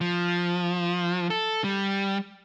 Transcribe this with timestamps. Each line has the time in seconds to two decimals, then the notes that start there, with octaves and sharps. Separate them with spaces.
0.01 F3
1.30 A4
1.64 G3